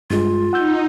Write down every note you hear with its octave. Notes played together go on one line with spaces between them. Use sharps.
G2 G#3 F4
D#4 F#5 E6 G6